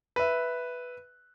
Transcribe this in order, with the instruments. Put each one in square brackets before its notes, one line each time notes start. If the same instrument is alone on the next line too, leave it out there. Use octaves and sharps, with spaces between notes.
[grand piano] B4 E5